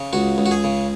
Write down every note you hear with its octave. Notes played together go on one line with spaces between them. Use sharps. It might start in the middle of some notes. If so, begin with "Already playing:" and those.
Already playing: C#3
C#2 F#4
C#2
F#4
G#4
C#3